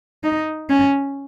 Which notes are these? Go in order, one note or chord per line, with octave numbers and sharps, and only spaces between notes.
D#4
C#4